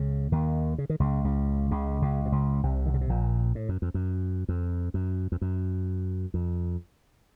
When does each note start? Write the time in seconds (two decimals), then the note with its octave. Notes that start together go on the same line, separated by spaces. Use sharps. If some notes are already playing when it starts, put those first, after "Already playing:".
Already playing: C#2 C#3
0.32 D#2 D#3
0.78 C#3
0.90 D#3
1.00 C#2 C#3
1.24 C#2 C#3
1.71 C#2 C#3
2.02 C#2 C#3
2.25 C3
2.32 C#2 C#3
2.63 C2 C3
2.86 D#3
2.94 C#3
3.01 C3
3.09 A#1 A#2
3.55 A2
3.69 F#2
3.82 F2
3.94 F#2
4.49 F2
4.94 F#2
5.32 F2
5.41 F#2
6.34 F2